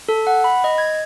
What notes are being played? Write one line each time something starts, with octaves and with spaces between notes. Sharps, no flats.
A4
F#5
B5
D#5
G#6